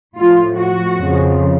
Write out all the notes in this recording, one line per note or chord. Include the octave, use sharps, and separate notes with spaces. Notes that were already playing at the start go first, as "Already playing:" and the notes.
A2 F3 F4
F#4
F2 C#3 F3